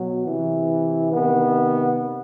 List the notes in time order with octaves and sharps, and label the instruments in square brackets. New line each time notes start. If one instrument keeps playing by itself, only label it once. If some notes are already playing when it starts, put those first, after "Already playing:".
Already playing: [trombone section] B2 F#3
C3 E3
C3 D#3 B3